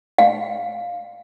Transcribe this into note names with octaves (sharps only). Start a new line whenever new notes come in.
F5